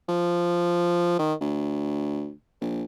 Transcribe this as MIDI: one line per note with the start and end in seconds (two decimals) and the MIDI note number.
0.09 1.14 53
1.19 1.34 51
1.41 2.31 38
2.61 2.83 34